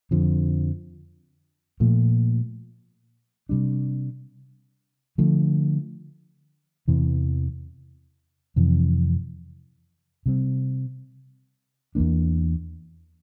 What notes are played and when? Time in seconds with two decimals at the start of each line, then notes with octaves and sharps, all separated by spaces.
0.11 F2 D3 F3
1.80 A#2 F3 A3
3.49 C3 G3 D4
5.18 D3 F3 A3
6.88 E2 C3 E3
8.56 F2 C3 E3
10.26 C3 G3 C4
11.95 E2 E3 A#3 D4